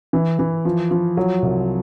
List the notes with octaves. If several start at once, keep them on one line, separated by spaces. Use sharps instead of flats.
E3
E3
F3
F3
F#3
C2